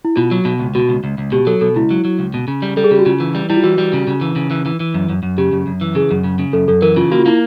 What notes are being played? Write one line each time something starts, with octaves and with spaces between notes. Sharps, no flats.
E4
B2 F4
F#3
B2
C#2
B2 F#4
C#2
C#2
C#2
B2 G4
F#3 A4
B2 A4
C#2 E4
F#3
F#3
C#2
B2
C#3
G3
G3 A4
G#4
C#3 G4
F#4
C#3 F4
E3
G3
G3 E4
F4
E3 F#4
G3
C#3
C#3
E3
C#3
E3
E3
E3
F#2
F#2
F#2
C#3 G4
F#2
F#2
E3
C#3 G#4
F#2
C#3
C#3
F#2 A4
F#2 A4
E3 A#4
C#3 F4
A#3 F#4
F4
A#3 E4